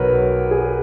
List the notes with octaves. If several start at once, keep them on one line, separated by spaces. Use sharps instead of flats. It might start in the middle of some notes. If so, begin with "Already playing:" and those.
Already playing: B1 B2 F#3 A#4 B4 C#5
G#4